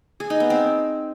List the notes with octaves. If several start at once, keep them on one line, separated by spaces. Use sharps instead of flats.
G#4
D#4
B3
C4